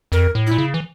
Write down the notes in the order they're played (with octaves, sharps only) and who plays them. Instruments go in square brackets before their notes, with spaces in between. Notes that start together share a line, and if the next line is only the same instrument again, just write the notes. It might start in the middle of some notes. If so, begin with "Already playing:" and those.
[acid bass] F2 [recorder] A#4
[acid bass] A2
[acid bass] A#2 [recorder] E4
[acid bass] C#3
E3